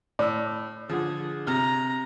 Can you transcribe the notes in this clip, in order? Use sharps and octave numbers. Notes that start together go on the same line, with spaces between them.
A2 D5 E6
D3 F3 G#4
C3 A#5 F6